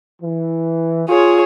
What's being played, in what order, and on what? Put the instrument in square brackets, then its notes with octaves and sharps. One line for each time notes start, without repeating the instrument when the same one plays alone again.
[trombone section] E3
[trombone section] F4 [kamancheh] G#4 C#5